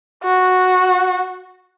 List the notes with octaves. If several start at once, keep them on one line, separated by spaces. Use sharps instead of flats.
F#4